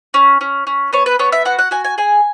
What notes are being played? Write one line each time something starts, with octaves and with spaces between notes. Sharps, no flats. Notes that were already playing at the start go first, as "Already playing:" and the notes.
C#4
C#4
C#4
B3 C#5
B4
B3 C#5
E5
F#4 F#5
F#5
F#4 G#5
G#5
G#4 G#5